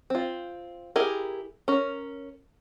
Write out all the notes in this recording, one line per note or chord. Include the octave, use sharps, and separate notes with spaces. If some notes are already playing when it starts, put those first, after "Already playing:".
C4 F4
E4 G4 G#4 A#4
C#4 A#4